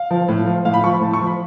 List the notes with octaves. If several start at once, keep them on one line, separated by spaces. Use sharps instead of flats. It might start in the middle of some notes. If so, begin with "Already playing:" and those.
Already playing: F5
F3
A2
F3
A2 F5
B5
F3 C#6
B5
A2 A5
C#6
F3
B5